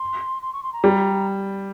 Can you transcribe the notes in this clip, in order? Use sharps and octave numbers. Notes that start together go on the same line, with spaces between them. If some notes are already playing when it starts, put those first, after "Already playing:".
Already playing: C6
C6
C#6
C6
A#5
G3